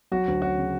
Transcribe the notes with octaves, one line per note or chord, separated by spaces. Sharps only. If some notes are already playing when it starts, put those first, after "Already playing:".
F#3 F#4
D2
C#4 F#4
C#3